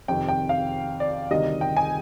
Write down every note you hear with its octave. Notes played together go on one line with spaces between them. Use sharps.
F2 C3 D#3 G5
G5
F5
D5
D2 C3 D#3 G3 D#5
G5
G#5